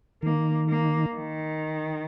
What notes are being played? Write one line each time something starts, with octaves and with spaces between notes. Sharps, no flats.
D#3 A#3
A#3
D#3